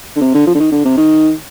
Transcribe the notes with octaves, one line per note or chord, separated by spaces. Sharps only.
D3
C3
D3
F3
D3
D#3
D3
C3
D#3